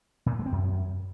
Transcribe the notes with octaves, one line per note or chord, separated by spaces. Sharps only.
A#2
G2
G#3
C4
F#2